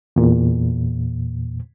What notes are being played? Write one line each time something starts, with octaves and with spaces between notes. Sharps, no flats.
E2 A#2